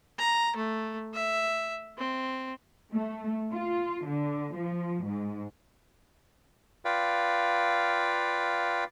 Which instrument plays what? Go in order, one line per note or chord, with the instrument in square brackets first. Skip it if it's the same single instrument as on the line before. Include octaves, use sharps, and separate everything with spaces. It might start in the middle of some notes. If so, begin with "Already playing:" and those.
[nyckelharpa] A#5
A3
E5
C4
[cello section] A3
F4
D3
F3
G#2
[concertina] F4 B4 D5 F5 G5